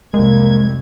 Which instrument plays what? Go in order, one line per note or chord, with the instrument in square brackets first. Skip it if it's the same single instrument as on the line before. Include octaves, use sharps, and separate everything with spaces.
[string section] C2 F2 G#6 [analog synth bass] G#3 [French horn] A#3